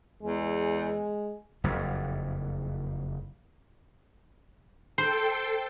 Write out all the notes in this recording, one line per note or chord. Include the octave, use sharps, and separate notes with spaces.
E2 G#3
F#1 F2
A4 C5 G5 C7